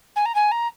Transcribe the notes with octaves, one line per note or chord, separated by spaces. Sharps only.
G#5
A#5
G#5
A#5